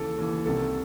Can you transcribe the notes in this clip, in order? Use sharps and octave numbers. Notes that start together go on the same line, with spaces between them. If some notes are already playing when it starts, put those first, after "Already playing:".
Already playing: D#2 C#3 E3 A4
D#2 C#3 E3
C2 C3 D#3 A4